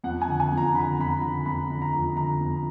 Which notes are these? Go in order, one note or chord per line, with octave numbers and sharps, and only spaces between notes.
F2 F#5
G#5
D3
G#5
F2
A#5
D3 B5
F2 B5
A#5
D3
F2 B5
D3
A#5
F2
D3 A#5
F2